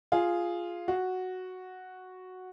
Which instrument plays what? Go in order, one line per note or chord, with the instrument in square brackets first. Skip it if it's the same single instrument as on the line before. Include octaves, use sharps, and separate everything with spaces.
[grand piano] F4 G#4
F#4